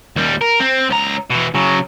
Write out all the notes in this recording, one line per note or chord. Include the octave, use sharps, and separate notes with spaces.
D#2 G3
A#4
C4
C#2 A#5
B2 E3
C#3 F#3